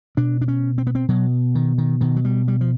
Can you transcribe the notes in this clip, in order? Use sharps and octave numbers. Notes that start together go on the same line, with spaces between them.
B2 D4
D4
C#4
C4
B3
C4
B2 F#3
D#3
D#3
B2 D#3
F#3
G3
G3
F3